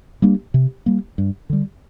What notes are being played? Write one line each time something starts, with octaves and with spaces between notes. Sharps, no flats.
G3 A#3 D4
C3
G3 A#3
G2
D3 G3